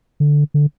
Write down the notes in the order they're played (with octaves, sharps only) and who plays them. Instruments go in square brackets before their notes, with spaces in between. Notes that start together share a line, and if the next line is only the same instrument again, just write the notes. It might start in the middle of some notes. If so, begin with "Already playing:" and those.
[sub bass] D3
D3